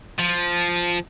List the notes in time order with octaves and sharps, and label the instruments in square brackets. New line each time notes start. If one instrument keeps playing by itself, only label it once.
[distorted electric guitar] F3